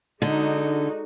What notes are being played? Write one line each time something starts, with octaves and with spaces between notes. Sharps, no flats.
D3 G#3 D#4 F#4